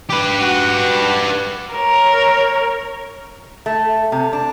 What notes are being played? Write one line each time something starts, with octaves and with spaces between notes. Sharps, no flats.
G4 B4
F#4
A#4 C#5
A3
C3
D4